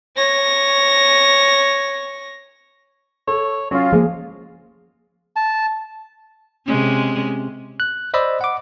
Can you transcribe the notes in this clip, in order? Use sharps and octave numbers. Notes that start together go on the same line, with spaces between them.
C#5 A#6
A4 C#5
F#3 C#4 F4
F3 G#3 A#3 G#4
A5
C3 G#3 C#4
F#6
C5 D5 D#5 B5 E6
F#5 D6